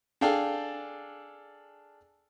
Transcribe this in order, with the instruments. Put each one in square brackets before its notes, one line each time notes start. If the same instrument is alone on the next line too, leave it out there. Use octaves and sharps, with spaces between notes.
[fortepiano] D4 G#4 A4 F5 G5